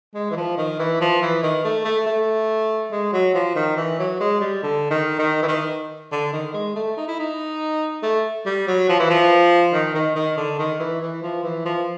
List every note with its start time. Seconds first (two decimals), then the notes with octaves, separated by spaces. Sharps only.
0.14 G#3
0.31 E3
0.37 F3
0.58 D#3
0.79 E3
1.01 F3
1.22 E3
1.43 D#3
1.64 A3
1.85 A3
2.06 A3
2.92 G#3
3.13 F#3
3.35 F3
3.55 D#3
3.77 E3
3.99 F#3
4.20 G#3
4.40 G3
4.63 D3
4.91 D#3
5.19 D#3
5.43 E3
5.48 D#3
6.12 D3
6.33 D#3
6.54 G#3
6.76 A3
6.97 D#4
7.08 E4
7.19 D#4
8.03 A3
8.46 G3
8.68 F#3
8.89 F3
8.99 E3
9.10 F3
9.73 D#3
9.95 D#3
10.16 D#3
10.37 D3
10.59 D#3
10.80 E3
11.01 E3
11.22 F3
11.44 E3
11.65 F3